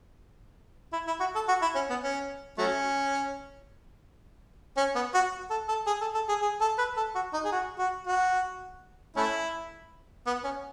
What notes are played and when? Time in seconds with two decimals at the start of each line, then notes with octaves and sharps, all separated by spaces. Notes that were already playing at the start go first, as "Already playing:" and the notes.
0.93 E4
1.07 E4
1.20 F#4
1.35 A4
1.48 F#4
1.62 E4
1.75 C#4
1.90 B3
2.03 C#4
2.58 F#3 A3 C#4
4.77 C#4
4.95 B3
5.14 F#4
5.50 A4
5.68 A4
5.87 G#4
6.01 A4
6.14 A4
6.29 G#4
6.42 G#4
6.61 A4
6.78 B4
6.97 A4
7.15 F#4
7.33 D#4
7.45 G#4
7.52 F#4
7.79 F#4
8.07 F#4
9.16 A3 C#4 E4
10.26 B3
10.44 C#4